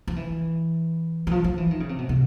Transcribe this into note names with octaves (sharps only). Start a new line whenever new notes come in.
F3
E3
E3
F3
F3
E3
D#3
C#3
C3
B2
C3